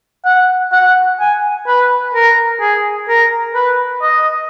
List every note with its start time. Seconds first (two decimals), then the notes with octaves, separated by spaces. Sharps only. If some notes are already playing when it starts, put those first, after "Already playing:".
0.25 F#5
0.72 F#5
1.20 G#5
1.67 B4
2.14 A#4
2.60 G#4
3.08 A#4
3.54 B4
4.02 D#5